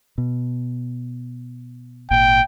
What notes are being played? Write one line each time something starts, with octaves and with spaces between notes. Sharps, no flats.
B2
G#1 A#2 G5